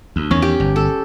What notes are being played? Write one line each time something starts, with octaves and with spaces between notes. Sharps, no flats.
D2
E2 D#3 C#4
G4
G1
A4